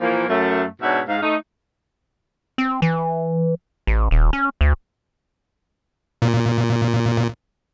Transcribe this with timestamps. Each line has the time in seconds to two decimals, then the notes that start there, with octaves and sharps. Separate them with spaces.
0.01 A#2 E3 F3 A#3
0.29 F#2 A3
0.82 G#2 B2 D4 C#5 E5 F#5
1.08 G#2 F5
1.22 A3 D#4
2.58 C4
2.82 E3
3.87 A1
4.11 D#1
4.33 C#4
4.61 D2
6.22 A#2